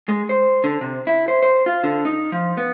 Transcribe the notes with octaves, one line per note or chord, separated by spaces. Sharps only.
G#3
C5
D3
C3
E4
C5
C5
F4
D3
D#4
F3
B3